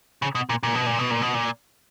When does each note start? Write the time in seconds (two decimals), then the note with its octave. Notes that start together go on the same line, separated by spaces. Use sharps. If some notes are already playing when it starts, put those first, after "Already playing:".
0.22 C#3
0.35 B2
0.49 A#2
0.63 A#2
0.75 B2
0.86 A#2
0.99 B2
1.11 A#2
1.22 B2
1.34 A#2